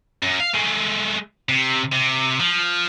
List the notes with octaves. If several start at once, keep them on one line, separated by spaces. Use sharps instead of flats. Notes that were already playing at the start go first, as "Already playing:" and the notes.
F#2
F5
G#3 A3
C3
C3
F3